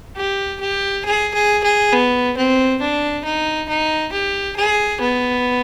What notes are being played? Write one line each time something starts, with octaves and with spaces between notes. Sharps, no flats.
G4
G4
G#4
G#4
G#4
B3
C4
D4
D#4
D#4
G4
G#4
B3